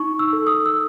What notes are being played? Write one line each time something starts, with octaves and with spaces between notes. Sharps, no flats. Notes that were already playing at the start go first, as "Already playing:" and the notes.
Already playing: D#4 C#6
E6
A4
D#6
E6